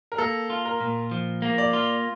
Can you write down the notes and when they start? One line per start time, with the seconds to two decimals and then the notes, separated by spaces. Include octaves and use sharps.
0.12 A#4
0.18 A#3 A4
0.50 F4
0.65 A#4
0.81 A#2
1.11 F3
1.42 A#3
1.58 D5
1.73 F4